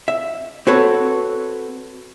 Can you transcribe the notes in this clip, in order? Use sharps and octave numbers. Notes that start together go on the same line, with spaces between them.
E5
C4 F#4 A4 B4 C#5